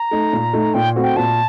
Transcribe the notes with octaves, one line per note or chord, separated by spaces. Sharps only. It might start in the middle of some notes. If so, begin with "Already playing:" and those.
Already playing: A#5
A3 D#4
A#2
A3 D#4
A#2 G5
A3 C4 F#4
G5
A#2 A5